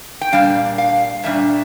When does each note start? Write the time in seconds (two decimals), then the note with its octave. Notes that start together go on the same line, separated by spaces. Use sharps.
0.21 G5
0.32 A#2 G3 D4 F5
0.78 F5
1.23 A#2 G3 D4 E5